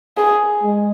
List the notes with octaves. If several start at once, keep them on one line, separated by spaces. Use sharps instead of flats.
G#4
G#3